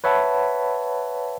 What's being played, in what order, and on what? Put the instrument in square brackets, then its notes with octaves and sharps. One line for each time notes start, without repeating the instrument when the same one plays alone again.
[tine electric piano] B4 C#5 E5 F#5 A5 B5